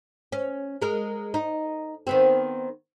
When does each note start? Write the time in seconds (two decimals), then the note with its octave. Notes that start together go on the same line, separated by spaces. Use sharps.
0.32 C#4
0.82 G#3 A#4
1.34 D#4
2.07 D#3 B3 C4